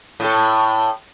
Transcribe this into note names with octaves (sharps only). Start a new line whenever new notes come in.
A2 A4